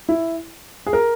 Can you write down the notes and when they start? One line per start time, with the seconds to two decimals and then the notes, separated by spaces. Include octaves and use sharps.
0.09 E4
0.86 G#4
0.93 A#4